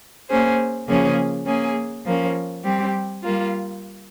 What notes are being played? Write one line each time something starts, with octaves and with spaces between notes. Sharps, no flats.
A#3 C#4 G#4 C5
C#3 F3 A#3 C#4 G#4
A#3 C#4 G#4
F3 A#3 C#4
G3 C4 G4
G3 A#3 F4